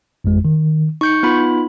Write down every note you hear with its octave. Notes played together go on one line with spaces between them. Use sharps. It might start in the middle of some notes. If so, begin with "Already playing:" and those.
G#1 F2 G#3
D#3
D#4 C#6 G6 C#7
B3 F4 B5